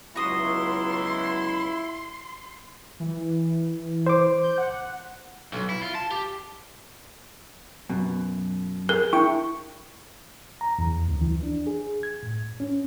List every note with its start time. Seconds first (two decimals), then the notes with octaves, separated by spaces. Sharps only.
0.16 C#2 F#3 B3 E4 F#4 E5 C6 D#6
3.00 E3
4.07 C5 C6 D6
4.43 G6
4.58 F#5
5.53 B1
5.70 E4
5.83 F4
5.95 A5
6.11 G4
7.89 F#2 B2
8.89 G#4 A#4
9.13 D4 E4 G5 C#6
10.61 A#5
10.79 E2
11.08 D2
11.22 E3
11.43 D4
11.67 G#4
12.03 G#6
12.23 A2
12.60 C#4